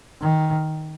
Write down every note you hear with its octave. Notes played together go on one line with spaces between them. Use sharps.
D#3